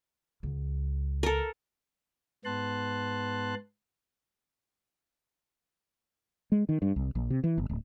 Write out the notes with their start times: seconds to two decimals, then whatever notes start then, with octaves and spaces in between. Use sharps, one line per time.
0.43 C#2
1.23 A4 A#4
2.45 G#2 B3 A5 C6 F#6
6.52 G#3
6.69 D#3
6.82 G2
6.96 C2
7.15 A#1
7.30 C3
7.44 E3
7.58 G1
7.69 D1